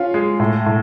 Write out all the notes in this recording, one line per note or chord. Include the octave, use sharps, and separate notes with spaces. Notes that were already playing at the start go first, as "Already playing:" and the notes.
Already playing: C#4 F4
G#3
A2
A2